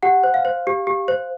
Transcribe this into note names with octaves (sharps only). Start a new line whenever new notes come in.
G4 F#5
C5
F5
C5
G4
G4
C5